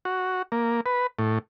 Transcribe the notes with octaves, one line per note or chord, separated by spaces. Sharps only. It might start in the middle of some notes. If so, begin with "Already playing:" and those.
F#4
A#3
B4
A2